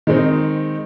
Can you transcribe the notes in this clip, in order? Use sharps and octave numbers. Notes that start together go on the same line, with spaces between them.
D#3 G#3 C4 D#4